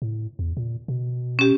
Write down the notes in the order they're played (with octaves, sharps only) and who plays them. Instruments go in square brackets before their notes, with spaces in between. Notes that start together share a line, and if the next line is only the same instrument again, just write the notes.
[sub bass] A2
E2
A#2
B2
[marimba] C#4 G4